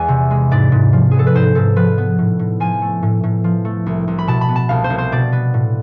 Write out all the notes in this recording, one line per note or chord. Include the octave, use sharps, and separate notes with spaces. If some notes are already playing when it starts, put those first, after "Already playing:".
Already playing: E2 G#3 B3 D5 G#5
C3
G#3
G#2 D5
G#2
F3
B3 G#4
A4
B4
G#2 C5
G#2 A4
F3 B4
B3
A2
A2
F3 G#5
A3
A2
A2
F3
A3
C2
C2
B5
B2 A5
B5
B3
A5
C2 F5
C5
C2
C5
B2 D5
B3
A2